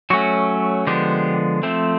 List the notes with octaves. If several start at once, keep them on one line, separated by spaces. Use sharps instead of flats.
F#3 A3 C#4 F#4
D3 F3 G#3 B3 G4
F3 A3 C4